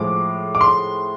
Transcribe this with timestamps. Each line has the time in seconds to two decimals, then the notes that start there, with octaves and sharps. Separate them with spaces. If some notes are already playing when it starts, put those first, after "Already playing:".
Already playing: A2 F3 G#3 D6
0.55 D6
0.61 C6